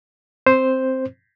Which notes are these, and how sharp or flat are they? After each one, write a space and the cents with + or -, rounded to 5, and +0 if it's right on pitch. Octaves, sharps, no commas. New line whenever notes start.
C4 +0 C5 +0